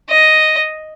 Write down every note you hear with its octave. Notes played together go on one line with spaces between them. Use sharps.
D#5